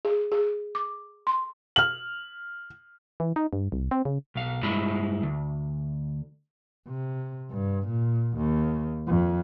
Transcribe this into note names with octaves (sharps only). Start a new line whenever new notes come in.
G#4
G#4
D6
C6
F6 F#7
E3
D#4
G2
C2
C4
C#3
B1 F5
G2 G#3 E4 B5
D2
C3
G2
A#2
D#2
F2